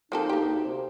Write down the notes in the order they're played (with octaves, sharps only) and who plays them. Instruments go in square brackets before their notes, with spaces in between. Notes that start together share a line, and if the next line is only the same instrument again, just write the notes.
[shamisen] F3 C4 A4 [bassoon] A#3 [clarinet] D#4
[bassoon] D2 [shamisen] A#3 G4
[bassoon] C3